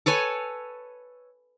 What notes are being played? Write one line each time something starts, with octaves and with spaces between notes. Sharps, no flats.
A4 B4 C#5 G#5